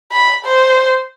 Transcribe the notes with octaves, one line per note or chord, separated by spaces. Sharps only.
B5
C5